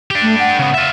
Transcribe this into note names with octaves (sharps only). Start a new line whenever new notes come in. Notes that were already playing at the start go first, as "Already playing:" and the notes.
D4 G4
A3
F#5
C#3 B3
F4 E5